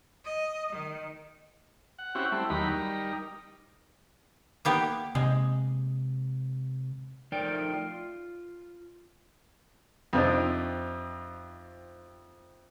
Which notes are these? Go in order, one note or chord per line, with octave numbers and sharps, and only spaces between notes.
D#5
D#3
F#5
C4 C#4 E4 F#4 G4 F#5
G3 A3 C4 E4
D#2 F#3 D#4 G4 A#4 B5
G3 D#4 A#4
A#3 B3 G4
C3 G#3
F3 A3 D#4 A#4 D5 G5
F4
F2 C3 D4 D#4